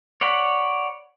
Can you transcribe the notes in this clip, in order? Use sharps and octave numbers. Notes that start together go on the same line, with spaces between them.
C#5 D5 F#5 B5